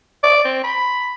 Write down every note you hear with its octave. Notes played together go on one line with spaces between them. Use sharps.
D5
C4
B5